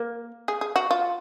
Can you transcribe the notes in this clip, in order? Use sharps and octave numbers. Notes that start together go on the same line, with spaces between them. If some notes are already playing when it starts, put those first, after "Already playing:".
Already playing: A#3
G#4
G#4
F#4
F4